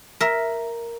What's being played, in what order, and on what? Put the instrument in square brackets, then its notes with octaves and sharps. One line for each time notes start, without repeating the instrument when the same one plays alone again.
[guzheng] A#4 E5